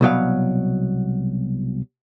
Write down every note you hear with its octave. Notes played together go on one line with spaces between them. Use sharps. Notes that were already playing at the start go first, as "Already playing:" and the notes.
C2 B2 F#3 F5